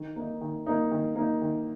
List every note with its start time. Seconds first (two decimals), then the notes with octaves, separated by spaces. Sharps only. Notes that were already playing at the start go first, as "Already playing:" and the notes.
Already playing: D#3
0.16 A#3 D#4
0.41 D#3
0.66 A#3 D#4
0.91 D#3
1.15 A#3 D#4
1.42 D#3